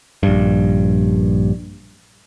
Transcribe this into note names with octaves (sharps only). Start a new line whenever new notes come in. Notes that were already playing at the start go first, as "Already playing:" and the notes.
A#1 G2